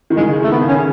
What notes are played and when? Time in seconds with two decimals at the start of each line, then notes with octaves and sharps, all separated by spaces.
0.10 D#3
0.17 C#3 G#3
0.39 D#3 A3
0.51 B3
0.62 C#3
0.68 C#4
0.75 C#3